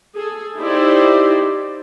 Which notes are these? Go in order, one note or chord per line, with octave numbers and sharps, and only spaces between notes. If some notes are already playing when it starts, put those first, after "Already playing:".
G#4 A4
D#4 E4 G4 C5 D5